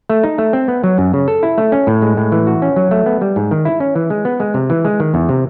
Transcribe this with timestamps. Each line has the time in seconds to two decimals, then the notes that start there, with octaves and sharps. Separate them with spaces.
0.10 A3
0.24 D#4
0.38 A3
0.53 C4
0.68 B3
0.84 F#3
0.98 F#2
1.13 C#3
1.28 A4
1.43 E4
1.58 A3
1.72 C#4
1.87 A2
2.02 G#3
2.17 A2
2.32 E3
2.47 F#4
2.62 C#4
2.76 F#3
2.91 A3
3.06 B3
3.21 G3
3.36 G#2
3.51 D#3
3.65 E4
3.80 C#4
3.96 E3
4.10 G#3
4.25 B3
4.40 G#3
4.54 C3
4.70 E3
4.85 G#3
5.00 D#3
5.14 E2
5.29 C3